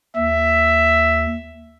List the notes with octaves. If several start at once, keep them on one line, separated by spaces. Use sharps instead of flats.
D#2 E5